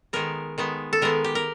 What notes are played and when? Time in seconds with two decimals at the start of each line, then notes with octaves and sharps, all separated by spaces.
0.13 D#3 G#3 B3 A#4
0.58 D#3 G#3 B3
0.93 A4
1.01 D#3 G#3 B3 A#4
1.24 G4
1.35 A#4